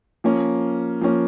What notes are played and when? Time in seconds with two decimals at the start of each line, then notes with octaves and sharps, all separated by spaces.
0.24 F3 A#3 C#4
1.01 F3 A#3 C#4